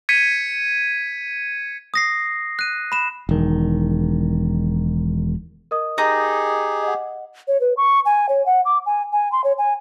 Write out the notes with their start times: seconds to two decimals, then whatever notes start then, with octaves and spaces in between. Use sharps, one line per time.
0.09 G#6 B6 C#7 D#7
1.94 D#6 A#6 C7
2.59 F#6 D#7
2.92 B5 E7
3.29 E1 D#3
5.71 A#4 D#5 D#6
5.98 D#4 G4 G#4
6.83 D#5 F#5
7.48 C#5
7.61 B4
7.77 C#6
8.06 G#5
8.29 C#5
8.46 F#5
8.65 D6
8.86 G#5
9.13 G#5
9.32 C6
9.44 C#5
9.58 G#5